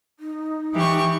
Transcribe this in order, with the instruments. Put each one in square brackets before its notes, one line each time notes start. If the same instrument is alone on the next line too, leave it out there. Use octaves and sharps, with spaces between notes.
[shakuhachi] D#4
[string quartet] E3 G4 C#6